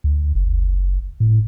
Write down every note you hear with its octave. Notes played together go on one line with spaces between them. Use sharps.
D2
F#1
A2